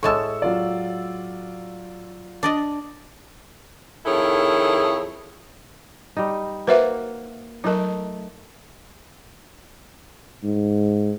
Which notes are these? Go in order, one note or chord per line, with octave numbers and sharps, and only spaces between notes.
A2 G#3 A5 C#6 E6
F#3 F4 D5
D4 D5 D#5
F2 D#3 E4 G#4 A4 C#5
G3 D#4
A#3 F#4 B4 C5 E5
F#3 A3 D#4 A#4
G#2